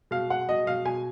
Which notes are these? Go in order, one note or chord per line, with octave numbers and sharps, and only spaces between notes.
B2 F5
B2 F#5
B2 D#5
B2 F5
B2 G#5